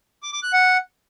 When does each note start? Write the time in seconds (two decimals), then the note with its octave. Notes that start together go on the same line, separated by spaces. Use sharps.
0.23 D6
0.33 D6
0.43 F#6
0.53 F#5